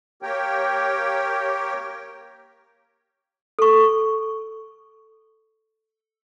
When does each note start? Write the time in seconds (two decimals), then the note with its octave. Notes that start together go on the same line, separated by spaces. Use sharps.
0.22 A#3 G4 A#4 C#5 G5
3.59 A4 C#6